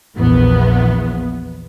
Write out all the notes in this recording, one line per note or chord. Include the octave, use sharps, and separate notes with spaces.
A#1 E2 B3